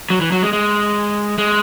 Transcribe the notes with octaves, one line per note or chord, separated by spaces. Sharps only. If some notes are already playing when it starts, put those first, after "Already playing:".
F#3
E3
F#3
G#3
G#3
G#3